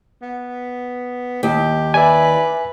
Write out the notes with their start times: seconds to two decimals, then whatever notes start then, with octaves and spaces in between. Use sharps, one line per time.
0.22 B3
1.43 D#2 G4
1.94 B4 D5 E5 G#5